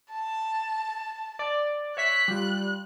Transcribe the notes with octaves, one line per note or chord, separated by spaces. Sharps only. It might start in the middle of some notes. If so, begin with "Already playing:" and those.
A5
D5
C#5 E5 F#6 B6
G3 F4